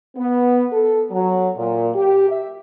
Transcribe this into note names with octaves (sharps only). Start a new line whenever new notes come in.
B3
A4
F#3
A#2
G4
E5